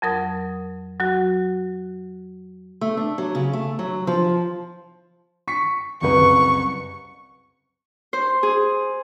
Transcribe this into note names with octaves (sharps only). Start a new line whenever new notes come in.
F2 F#3 A#4 D#6
F#3 F#4
A3
D4
F#3
C#3
A3
F#3
F3
C#6 B6 C#7
F#1 C2 B4 C#6
C5
G#4